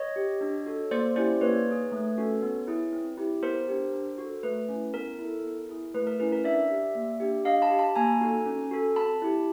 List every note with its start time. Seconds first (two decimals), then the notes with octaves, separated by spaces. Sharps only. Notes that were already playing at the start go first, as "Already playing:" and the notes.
Already playing: C#5 D#5
0.16 G4
0.41 D4
0.66 F#4 A4
0.91 A#3 C5 D5
1.16 C#4 E4 G4 C5 D5
1.41 A#3 B4 C#5
1.67 D#4 G#4
1.92 A3
2.17 C#4 F#4 A4
2.42 B3
2.67 E4 G#4
2.93 C4
3.17 E4 G4
3.42 B3 A#4 C5
3.68 D4 G4
3.93 D4
4.18 F#4 A4
4.43 A3 B4
4.69 C#4 E4
4.93 B3 A#4
5.19 E4 A4
5.44 B3
5.69 E4 G#4
5.94 A3 B4
6.07 A#4
6.20 C#4 E4 B4
6.32 A#4
6.44 D4 D5 E5
6.70 G4
6.95 A#3
7.20 D4 G4
7.45 D4 D#5 F5
7.62 A5 B5
7.70 G4
7.79 A5 B5
7.95 A#3 G#5 A#5
8.21 D#4 F#4 A4
8.46 C#4
8.71 F#4 A4
8.96 C4 A5 B5
9.22 E4 G4